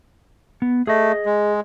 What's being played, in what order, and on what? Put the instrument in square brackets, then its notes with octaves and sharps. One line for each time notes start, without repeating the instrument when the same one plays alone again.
[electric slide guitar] B3
[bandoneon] A3 [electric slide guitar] G#4 D#5
[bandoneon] G#3